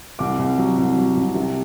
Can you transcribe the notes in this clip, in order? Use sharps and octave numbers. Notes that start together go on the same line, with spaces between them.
C2 D6
C2
F#3
C2
F#3
C2
C3